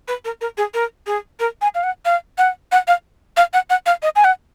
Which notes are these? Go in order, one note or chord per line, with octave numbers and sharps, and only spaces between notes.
B4
A#4
A#4
G#4
A#4
G#4
A#4
G#5
F5
F#5
F5
F#5
F#5
F5
F5
F#5
F#5
F5
D#5
G#5
F#5